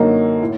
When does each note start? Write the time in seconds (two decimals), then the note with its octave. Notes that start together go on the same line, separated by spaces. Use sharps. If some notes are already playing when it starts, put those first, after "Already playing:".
Already playing: F#2 D3 F#3 A#3 D#4
0.42 A2